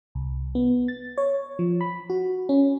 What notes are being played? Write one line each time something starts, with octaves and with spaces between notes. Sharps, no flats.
C2
B3
A6
C#5
F3
B5
F#4
C#4